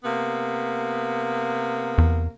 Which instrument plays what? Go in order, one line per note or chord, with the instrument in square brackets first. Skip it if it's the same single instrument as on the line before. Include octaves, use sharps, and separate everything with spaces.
[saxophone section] C3 A#3 B3
[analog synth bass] E2